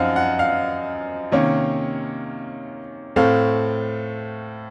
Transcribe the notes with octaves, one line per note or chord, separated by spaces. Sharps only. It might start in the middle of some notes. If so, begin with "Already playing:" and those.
Already playing: F#2 F3 C4 D#4 F5 F#5
F#5
F5
C3 D#3 A#3 C#4
A2 A3 C4 F5